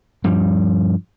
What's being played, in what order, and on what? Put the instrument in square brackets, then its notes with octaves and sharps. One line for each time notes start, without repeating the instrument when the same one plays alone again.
[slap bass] G2 F3 G3